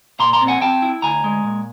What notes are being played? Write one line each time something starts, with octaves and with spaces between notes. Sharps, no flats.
A#2 A#5 C6
A#5 C6
C4
F#5 G#5
C4 G5 A5
E4
D2 G#5 A#5
G#3
A#2